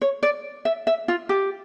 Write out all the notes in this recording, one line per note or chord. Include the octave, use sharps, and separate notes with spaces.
C#5
D5
E5
E5
F4
G4